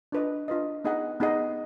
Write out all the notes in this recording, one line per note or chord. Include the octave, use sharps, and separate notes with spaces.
D4 F4 B4 D#5
D4 F4 B4 D#5
B3 D#4 G#4 D#5 F#5
B3 D#4 G#4 D#5 F#5